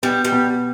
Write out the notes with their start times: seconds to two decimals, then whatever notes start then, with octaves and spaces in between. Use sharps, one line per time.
0.03 G3 B3
0.25 G3
0.32 B2